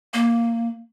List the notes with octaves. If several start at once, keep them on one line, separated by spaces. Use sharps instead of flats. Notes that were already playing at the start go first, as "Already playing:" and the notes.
A#3